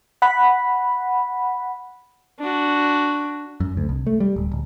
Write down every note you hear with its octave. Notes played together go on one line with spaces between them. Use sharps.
F#5 B5
D4 F#4
F#2
D2
C2
A3
G3
D1
D1